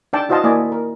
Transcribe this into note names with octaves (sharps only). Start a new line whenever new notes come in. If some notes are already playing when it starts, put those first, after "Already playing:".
D4 D#4 D5 G5 A5
E4 F#4 C5 D#5 F5 A5
A#3 E4 D5 D#5 G#5
A#4